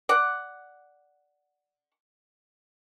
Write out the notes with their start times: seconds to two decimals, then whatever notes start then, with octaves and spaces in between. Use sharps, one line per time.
0.09 D5 F#5